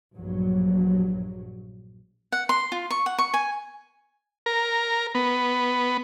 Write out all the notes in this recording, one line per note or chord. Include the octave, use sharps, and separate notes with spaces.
A#1 G2 F#3
F#5
C6
F4
C#6
F#5
C#6
G#5
A#4
B3